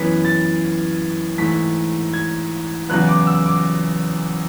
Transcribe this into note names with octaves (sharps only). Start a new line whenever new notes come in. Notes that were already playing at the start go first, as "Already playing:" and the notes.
Already playing: F#2 E3 B3 B6
A6
G#2 E3 A3 B6
G#6
E2 C#3 F#3 B3 F#6
D6
E6
D6